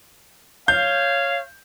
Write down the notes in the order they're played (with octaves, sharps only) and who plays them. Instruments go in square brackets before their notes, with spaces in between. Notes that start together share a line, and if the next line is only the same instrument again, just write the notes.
[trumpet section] C#5 F5 [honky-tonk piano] G6